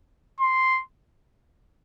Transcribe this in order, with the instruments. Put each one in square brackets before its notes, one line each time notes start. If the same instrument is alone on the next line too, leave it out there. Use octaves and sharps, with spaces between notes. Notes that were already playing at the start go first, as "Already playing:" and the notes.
[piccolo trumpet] C6